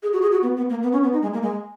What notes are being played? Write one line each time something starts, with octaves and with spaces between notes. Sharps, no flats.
G#4
F#4
G#4
F#4
B3
B3
A#3
B3
C#4
B3
D#4
G#3
A#3
G#3